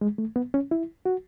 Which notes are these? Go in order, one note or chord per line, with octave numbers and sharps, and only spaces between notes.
G#3
A3
B3
C#4
E4
F#4